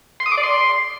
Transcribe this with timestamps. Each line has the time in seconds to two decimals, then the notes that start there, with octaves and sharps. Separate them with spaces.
0.20 C6
0.26 D#6
0.32 D6
0.37 D5
0.43 C6